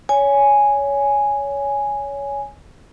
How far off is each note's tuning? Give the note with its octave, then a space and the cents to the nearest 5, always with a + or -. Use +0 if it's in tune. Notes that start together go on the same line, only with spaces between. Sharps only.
C#5 +20 G#5 +0